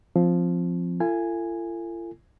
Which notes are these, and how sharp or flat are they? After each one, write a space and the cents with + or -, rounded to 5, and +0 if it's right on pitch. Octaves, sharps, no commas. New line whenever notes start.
F3 +0 C4 +0
F4 -45 A4 +40 G#5 -5